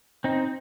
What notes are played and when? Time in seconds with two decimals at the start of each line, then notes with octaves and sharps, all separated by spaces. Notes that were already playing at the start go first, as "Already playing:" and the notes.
0.24 C4 D#4